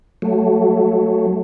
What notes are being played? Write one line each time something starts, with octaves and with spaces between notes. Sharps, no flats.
F#3 A3